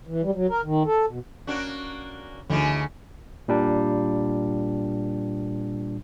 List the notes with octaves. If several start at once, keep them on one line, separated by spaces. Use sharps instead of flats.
E3
G3
F#3
A#4
D#3
A4
B2
A#3 C#4 D4 F#4
D2 C#3 E3 D#4
A#2 G3 D4